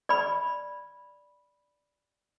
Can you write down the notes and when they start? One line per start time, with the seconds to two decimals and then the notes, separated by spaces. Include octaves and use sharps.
0.09 D5 B5